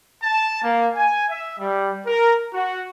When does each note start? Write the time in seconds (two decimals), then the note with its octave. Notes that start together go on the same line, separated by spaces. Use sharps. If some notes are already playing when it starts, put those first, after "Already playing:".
0.21 A5
0.62 A#3
0.95 G#5
1.29 E5
1.58 G3
2.05 A#4
2.53 F#4